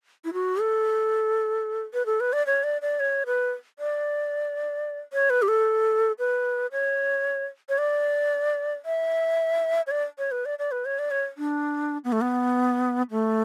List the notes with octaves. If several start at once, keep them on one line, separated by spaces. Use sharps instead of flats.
E4
F#4
A4
B4
A4
B4
D5
C#5
D5
D5
C#5
B4
D5
C#5
B4
G4
A4
B4
C#5
C#5
D5
E5
C#5
D5
C#5
B4
D5
D5
B4
C#5
D5
C#5
D4
B3
A3
B3
A3